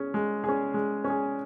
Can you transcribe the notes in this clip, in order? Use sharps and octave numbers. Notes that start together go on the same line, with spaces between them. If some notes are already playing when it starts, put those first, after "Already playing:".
Already playing: C#4 G#4
G#3
C#4 G#4
G#3
C#4
G#4